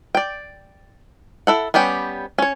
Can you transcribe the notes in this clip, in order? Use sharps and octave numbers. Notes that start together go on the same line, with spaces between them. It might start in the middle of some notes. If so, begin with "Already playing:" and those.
D5 G5
E4 A4 F#5
G3 B3 C#4 G4
C#4 C#5